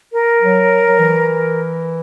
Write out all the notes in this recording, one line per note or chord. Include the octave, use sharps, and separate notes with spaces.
A#4
F#3
F#3
E3